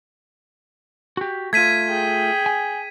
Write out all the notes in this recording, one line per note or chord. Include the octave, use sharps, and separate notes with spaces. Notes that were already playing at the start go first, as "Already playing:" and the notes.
F#4 G4
A3 F4 G#6 B6 D#7
G#4 G5
G#5